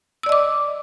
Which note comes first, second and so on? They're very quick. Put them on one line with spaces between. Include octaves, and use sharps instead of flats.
E6 D5 D#5 D6